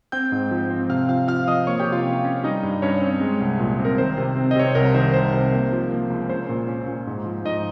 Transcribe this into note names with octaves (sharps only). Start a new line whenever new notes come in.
C4 G5 G6
G#2
F3
C4
C3 F5 F6
F3 F5 F6
F3 F5 F6
F3 D#5 D#6
A#3 C#5 C#6
G4 G5
C3
F4 F5
C#4
C#4
G3 D#4 D#5
G2
G2 C#4 C#5
C4
G#3
C2
A#2
C4
A#4
D#3 C5
C3
C4
D#5
C3 C#5
C5
C2 A#4
D#3 C5
C2 C5
C3
A#3
F3
A#3
C#2
C#4 C5
A#2
C#4
A#2
G#2
F3
G#2 D#4 D#5